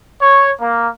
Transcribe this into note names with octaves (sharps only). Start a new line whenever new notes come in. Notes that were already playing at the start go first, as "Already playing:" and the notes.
C#5
A#3